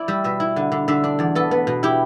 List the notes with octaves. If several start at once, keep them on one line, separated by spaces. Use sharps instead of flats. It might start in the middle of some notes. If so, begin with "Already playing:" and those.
Already playing: E4 D5
G3 E5
B2 E5
E4
D3
D3
D3 E5
D4
E2 D5
B3 A4
B3
B2
E4 G4